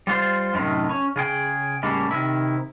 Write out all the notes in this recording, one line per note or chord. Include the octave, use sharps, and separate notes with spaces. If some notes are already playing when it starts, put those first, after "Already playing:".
G3 F4 C5
F#2 A2 C3 D#3
C#4
C#3 G#4 G5
A2 C#3 G3 A#3
C3 D#3 E4